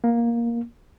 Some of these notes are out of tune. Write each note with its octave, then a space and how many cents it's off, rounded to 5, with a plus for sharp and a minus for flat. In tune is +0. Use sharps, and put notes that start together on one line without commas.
A#3 +10